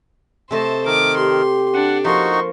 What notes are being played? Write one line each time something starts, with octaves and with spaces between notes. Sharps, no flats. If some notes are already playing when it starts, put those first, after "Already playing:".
C3 A3 C5 D#5 A5
D#3 A#4 D6
G4 C6
D4 F#5
F3 A#3 D#4 F#4 C6 C#6